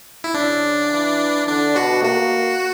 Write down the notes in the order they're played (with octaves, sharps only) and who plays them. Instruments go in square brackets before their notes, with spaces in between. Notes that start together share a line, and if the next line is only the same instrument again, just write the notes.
[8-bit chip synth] E4
[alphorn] C#3 [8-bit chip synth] D4
[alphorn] E3
[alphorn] D3 [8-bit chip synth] D4
[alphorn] B2 [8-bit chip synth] F#4
[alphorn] A#3 [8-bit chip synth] F#4